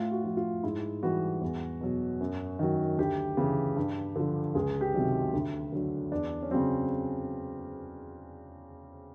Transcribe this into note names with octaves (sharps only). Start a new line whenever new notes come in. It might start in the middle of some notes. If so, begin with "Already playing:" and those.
Already playing: A2 F4
F#4
F3
F4
G#2 E4
E3 G3 F#4
E2
B2 F#3
F#2
D#3 F#3
D2 G4
C#3 E3
G2
D3 F3
C#2 G#4
G4
C3 D#3 F#3
D2
D3 F#3
E2 D4
C#4
C#3 F#3 C4